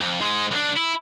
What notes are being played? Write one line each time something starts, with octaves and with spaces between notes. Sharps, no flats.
F2
G#2 G#3
B1 D4
E4